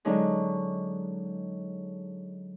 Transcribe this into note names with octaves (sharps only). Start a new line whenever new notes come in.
D3 F#3 G#3 C#4 D#4